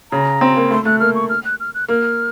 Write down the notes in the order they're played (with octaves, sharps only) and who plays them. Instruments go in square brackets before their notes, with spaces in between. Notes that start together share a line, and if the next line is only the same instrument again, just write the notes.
[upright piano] C#3 [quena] A#5
[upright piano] C4
A#3
[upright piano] A3 [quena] C6
[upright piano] A3 [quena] F#6
[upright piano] A#3 [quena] F6
[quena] C#6
F6
F#6
F6
F#6
[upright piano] A#3 [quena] F6